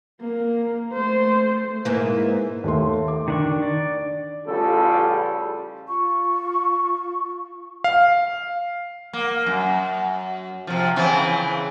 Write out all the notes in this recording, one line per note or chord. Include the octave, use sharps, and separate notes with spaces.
A#3
A3 C5
G#2 E3 A#3
D#2 A3 C6
D6
D#3 D4 C#6
D5
A1 C#3 G3 F4 A4
F4 C#6
F5
A#3
F#2
C3 F3
C#3 E3 C4